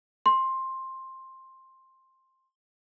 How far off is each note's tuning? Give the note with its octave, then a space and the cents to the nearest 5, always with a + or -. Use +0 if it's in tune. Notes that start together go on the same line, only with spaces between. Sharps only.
C6 +10